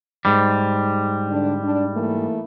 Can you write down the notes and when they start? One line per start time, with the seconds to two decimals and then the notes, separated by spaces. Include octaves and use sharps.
0.25 G#2 G3
1.28 D3 D4
1.63 D4
1.94 E3 A3 A#3